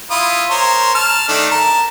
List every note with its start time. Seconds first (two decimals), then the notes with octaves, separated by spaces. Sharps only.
0.11 E4 F4 D#6
0.50 A#4 C5 C#5
0.95 A5 F6
1.28 D#3 A3 D4
1.51 A#4 A5